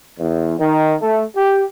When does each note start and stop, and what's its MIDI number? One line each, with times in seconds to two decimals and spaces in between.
0.19 0.56 40
0.60 0.95 51
1.01 1.23 57
1.37 1.64 67